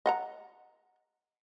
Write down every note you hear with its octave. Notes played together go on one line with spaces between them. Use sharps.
D#5 F#5 A#5